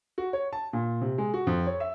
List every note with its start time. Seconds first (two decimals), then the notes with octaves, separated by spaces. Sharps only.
0.18 F#4
0.33 C#5
0.53 A5
0.73 A#2
1.01 C3
1.18 G#3
1.34 F#4
1.47 F2
1.67 C#5
1.80 E5